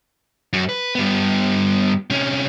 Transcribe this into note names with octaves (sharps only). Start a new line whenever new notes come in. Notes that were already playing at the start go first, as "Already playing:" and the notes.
F#2
B4
G2 B3
C3 C#4